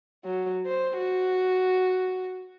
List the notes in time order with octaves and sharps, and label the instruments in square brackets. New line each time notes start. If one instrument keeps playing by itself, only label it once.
[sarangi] F#3
C5
F#4